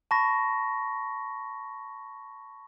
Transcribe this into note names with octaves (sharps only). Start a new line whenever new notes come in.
A5 B5 C#6 A#6